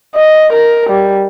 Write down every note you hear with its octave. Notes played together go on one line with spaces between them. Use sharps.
D#5
A#4
G3